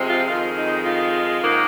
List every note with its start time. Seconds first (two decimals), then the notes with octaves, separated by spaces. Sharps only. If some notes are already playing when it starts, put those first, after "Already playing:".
Already playing: C3 F3 G#3 C4
0.09 F4
0.28 F2 D#3 G#3 F4
0.56 D#4
0.85 F4
1.41 G#2 D#3 A#3 C#4